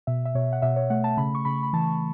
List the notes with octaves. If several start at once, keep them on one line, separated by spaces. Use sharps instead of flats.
B2 E5
E5
B2 C#5
F#5
B2 E5
C#5
A3 F#5
A5
C#3 B5
C#6
C#3 B5
B5
E3 A5